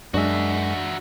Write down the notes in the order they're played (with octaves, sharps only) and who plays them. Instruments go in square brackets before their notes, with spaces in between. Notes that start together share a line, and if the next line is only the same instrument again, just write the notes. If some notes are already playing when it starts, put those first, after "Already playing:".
[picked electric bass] F#2 G#3 [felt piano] D4 [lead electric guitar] F#4 E5